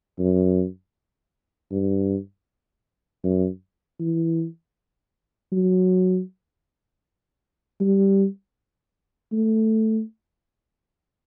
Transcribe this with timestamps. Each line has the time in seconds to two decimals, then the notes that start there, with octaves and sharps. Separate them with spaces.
0.19 F#2
1.71 G2
3.24 F#2
4.00 E3
5.52 F#3
7.80 G3
9.33 A3